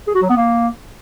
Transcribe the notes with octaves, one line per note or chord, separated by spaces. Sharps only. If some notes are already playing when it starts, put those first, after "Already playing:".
G#4
F#4
F#3
B3
A#3